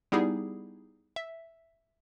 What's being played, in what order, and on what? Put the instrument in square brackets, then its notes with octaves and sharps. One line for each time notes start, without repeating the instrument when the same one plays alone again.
[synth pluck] G3 B3 D#4 E4 G4 G#4
E5